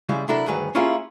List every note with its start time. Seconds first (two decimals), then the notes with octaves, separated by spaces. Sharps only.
0.09 C#3 G3 G#3 E4
0.28 C3 F#3 D4 E4 A4 A#4
0.46 D2 G2 D#3 F#3 G#4 B4
0.75 A#3 C#4 E4 F4 G4 G#4